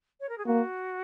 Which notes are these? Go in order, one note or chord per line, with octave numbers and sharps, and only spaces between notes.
C#5
A#4
G#4
A#3 F#4